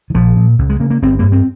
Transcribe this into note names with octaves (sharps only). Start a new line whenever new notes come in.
D#3
A#1 F3
A#2
C#2
G#3
C#3 A#3
A#3
G1 C4
G2 A#3
C4